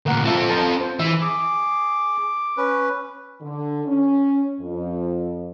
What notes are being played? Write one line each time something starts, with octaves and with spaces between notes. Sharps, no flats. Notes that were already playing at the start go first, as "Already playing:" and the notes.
D2 A#2 A#4 F#5
C4 F4 A4 E5
C5 A5 A#5
C5
E3 E5
G#4 D6
C#4 B4
D3
C#4
F2